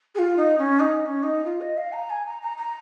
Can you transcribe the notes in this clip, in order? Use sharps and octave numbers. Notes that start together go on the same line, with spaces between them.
G#4
F4
D#4
C#4
D#4
D#4
C#4
D#4
F4
D#5
F5
A#5
G#5
A#5
A#5
A#5